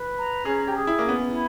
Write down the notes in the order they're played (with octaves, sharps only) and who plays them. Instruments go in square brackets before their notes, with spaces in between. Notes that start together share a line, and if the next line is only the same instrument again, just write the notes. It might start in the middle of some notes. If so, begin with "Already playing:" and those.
Already playing: [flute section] B4
A#5
[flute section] C#4 [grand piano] G#4
[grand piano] G4
[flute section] G#4
[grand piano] E4
[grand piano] A#3 [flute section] C#4
[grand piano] B3
[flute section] E4